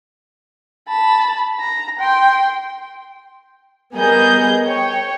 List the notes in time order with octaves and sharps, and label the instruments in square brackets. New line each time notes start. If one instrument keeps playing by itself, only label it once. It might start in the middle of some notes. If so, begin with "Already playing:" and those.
[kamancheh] A5 B5
A#5
G5 C6
[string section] G3 B3 G#4 A#4 D#5 G6
C#5 G5